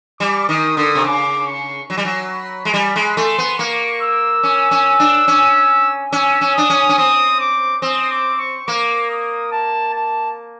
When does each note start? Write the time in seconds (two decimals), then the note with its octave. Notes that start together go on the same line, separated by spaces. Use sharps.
0.20 G3 D6
0.49 D#3 D#6
0.77 D3 D#6
0.95 C3
1.04 C#3 D6
1.47 C#6
1.90 F#3
1.97 G3
2.05 F#3
2.32 B5
2.65 G#3
2.74 G3 B5
2.96 G#3
3.17 A3 C6
3.38 B3
3.58 A#3 C#6
4.01 E6
4.43 C#4
4.71 C#4
5.00 D4
5.28 C#4
6.12 C#4 E6
6.41 C#4
6.55 D4 D#6
6.70 C#4
6.89 C#4
6.98 C4 D#6
7.40 D6
7.82 C4 D#6
8.11 D6
8.39 C#6
8.67 A#3 D6
9.10 D#6
9.52 A5
9.94 A5